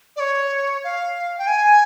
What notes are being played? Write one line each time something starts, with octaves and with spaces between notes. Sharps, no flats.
D5
C#5
F5
G5
G#5